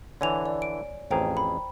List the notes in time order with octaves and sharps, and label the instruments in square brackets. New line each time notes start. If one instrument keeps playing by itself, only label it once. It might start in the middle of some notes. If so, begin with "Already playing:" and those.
[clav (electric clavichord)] D3 E3 [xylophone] C#5 G#5 F7
[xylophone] D5
D7
[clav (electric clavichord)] A1 F2 G#4 [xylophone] C5 G5 A#5
[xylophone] B5